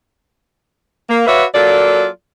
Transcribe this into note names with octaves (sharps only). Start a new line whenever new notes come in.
A#3
F#4 B4 C#5 D5 E5 F5
F#3 A#3 F4 A4 D5